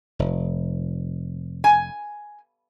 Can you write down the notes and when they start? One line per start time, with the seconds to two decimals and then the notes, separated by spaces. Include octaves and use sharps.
0.19 F1
1.64 G#5